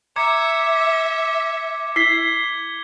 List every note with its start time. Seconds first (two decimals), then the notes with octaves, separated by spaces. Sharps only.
0.16 E5 A#5 D6 G#6 C#7
1.96 E4 G#6 B6 C7 G7